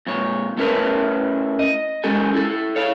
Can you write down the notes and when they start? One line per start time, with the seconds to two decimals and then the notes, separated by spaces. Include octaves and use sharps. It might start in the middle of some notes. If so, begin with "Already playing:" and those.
0.07 F2 A#2 C#5
0.58 A3 C#4 E4 A#4 B4 C#5
1.59 D#5
2.04 G#3 C#4 G4 A4 G#5
2.35 E4 A4
2.76 C#5 F5